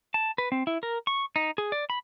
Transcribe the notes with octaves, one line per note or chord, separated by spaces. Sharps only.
A5
B4
C4
E4
A#4
C#6
D#4
G#4
D5
B5